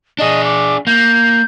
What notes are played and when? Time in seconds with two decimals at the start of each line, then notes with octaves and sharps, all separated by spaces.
0.19 D4 G#4 D#5
0.45 D6
0.87 A#3 G6